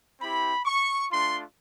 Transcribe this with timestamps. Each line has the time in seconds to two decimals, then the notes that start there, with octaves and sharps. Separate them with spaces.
0.20 C4 E4 G4 B5
0.65 C#6
1.11 A3 D4 F4 C6